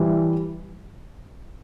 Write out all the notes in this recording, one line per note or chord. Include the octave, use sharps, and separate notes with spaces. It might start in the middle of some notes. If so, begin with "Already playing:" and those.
Already playing: E3 G3